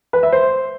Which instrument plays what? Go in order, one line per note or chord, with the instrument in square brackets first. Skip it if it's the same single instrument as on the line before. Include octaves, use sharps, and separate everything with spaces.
[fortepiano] B4
E5
C5